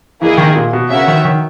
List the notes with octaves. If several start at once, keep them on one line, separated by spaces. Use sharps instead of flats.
E3 A#3 E4 G#4 D#5
D#3
A#2
B2
C#3 B3 F#4 A#4 C#5 E5
D#3
D#3